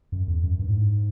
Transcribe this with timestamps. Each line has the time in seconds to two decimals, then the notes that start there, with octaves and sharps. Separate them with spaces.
0.12 F#2
0.28 E2
0.44 F#2
0.59 G2
0.68 A2
0.75 G#2